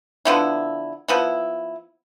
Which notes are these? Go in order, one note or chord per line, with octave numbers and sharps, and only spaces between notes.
D3 F3 B3 E4
F3 B3 E4